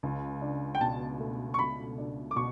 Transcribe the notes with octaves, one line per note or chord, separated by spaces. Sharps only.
C#2
D4
G5
B2 A5
A3
C#6
C#2 B5
D4
D6
B2 C#6